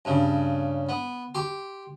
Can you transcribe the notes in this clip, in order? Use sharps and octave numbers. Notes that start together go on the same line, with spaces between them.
G2 C#3
B3
G4 C6